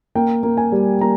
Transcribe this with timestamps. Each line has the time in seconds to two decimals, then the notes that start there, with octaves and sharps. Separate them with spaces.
0.15 A#3 G5
0.43 A#3
0.57 G#5
0.72 G3
1.01 A#3 A#5